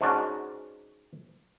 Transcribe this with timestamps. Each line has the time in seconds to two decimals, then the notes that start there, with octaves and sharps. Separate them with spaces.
0.01 G#2 C#4 D4 F#4